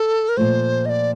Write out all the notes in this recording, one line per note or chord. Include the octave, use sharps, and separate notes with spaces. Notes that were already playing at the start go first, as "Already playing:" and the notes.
Already playing: A4
A#4
A#2 F3 A3 C5
D#5
D5